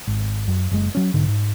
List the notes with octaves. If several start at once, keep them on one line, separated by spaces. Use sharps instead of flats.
G#1
F#2
F#1 G#3
F#3 C#4
B1 G#2 D3
G#2